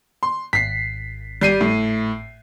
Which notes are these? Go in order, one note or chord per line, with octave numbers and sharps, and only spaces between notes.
C6
G#1 B6 C7
G3 C7 D#7
A2